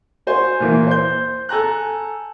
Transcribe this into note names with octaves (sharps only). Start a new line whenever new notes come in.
F#4 C5 G#5
A#2 E3 A#3
C5 G6
A4 G#5 A#5 F#6